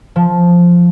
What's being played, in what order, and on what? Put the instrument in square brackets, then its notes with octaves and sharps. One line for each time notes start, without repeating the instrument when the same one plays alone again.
[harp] F3